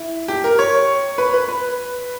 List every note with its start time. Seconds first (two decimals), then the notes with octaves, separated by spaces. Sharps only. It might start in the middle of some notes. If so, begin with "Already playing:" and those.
Already playing: E4
0.28 G4
0.44 A#4
0.59 C#5
1.18 B4
1.33 B4
1.48 B4